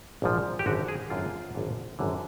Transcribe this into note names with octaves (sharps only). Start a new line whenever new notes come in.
A#1 G#2 F3
G4
G#1 F#2 D3 F#4
G#4
G#1 F#2 D3 F4
G#1 F#2 D3
G#1 F#2 D3